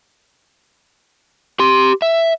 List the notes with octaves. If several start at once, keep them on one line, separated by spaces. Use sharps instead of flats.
G4 C6
E5